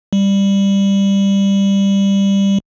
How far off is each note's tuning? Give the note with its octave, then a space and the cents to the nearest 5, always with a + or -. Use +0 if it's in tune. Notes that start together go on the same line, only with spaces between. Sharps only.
G3 +10